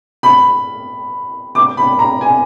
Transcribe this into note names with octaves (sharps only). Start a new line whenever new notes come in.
B5
D6
B5
A#5
G#5